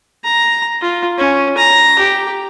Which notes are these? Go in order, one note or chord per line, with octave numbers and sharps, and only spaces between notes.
A#5
F4
C#4
A#5
G4